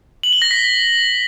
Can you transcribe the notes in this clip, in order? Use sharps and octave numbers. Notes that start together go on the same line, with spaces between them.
F#7
G7
A#6
B6